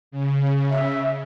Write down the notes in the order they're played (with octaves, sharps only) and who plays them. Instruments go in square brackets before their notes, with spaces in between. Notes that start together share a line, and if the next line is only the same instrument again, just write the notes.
[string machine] C#3
[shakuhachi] E5